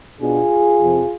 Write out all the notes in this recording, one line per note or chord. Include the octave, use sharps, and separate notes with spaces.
B2 B3 D4 F4 G#4
F2 C3 F3